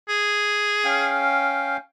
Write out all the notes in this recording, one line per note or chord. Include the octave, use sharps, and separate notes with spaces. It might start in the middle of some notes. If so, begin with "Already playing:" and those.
G#4
C#4 F5 G5